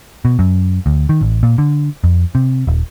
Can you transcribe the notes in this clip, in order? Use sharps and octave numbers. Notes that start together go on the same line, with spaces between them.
B2
F#2
D2
D#3
A1
A#2
D3
F2
C3
D#1